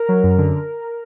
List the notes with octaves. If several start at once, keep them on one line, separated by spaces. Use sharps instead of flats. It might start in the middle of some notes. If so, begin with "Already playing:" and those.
Already playing: A#4
F#3
F#2
D3